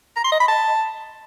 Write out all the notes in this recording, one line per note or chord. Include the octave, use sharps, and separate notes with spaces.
A#5
C6
D#5
B5
A5